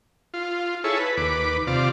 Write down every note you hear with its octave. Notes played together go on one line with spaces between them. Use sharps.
F4
E4 G#4 A4 C#5
B4
D#2 B4 D6
C3 F4 D5